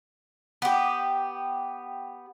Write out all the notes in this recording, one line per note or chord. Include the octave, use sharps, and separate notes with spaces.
B3 G4